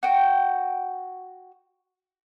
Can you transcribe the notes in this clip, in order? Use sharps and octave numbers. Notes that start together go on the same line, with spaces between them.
F#4 G5